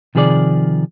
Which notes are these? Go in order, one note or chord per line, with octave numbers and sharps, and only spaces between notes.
C3 D#3 F3 G#4 B4 D5